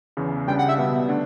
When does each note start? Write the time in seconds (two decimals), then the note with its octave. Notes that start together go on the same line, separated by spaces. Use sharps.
0.17 E2 C#3 E3
0.47 C#2 C#3 G3 D4 G5
0.58 F#5
0.69 E5
0.78 B2 G3 B3
1.09 D3 A3 D4